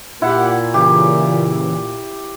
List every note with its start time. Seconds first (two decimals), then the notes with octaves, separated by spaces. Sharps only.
0.22 A#2 E4 G4 F#5
0.74 C#3 E3 G4